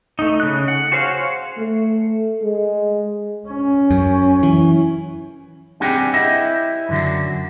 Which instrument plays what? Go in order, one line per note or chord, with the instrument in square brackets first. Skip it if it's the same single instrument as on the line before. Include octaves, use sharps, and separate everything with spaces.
[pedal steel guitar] A3 D#4
C#3 F#6
F#5
F#4 G#4 C5 C#5 F5
[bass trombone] A3
G#3
[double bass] C#4
[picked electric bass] F#2
E3
[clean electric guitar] G3 C4 D4 G4 G#4 F#5
E4 G4 C5 D#5 E5
F#2 D3 F#3